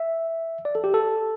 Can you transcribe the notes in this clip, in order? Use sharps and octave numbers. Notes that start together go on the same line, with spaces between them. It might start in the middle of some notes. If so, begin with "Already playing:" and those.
Already playing: E5
D5
A4
G4
A4